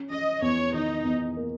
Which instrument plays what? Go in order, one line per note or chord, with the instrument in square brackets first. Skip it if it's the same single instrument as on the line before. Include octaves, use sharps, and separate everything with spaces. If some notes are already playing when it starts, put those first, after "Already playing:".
Already playing: [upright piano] C#4
[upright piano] C#4 [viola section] D#5
[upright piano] E2 [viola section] C#5
[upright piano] D#3 [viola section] D#4
[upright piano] E2
A#3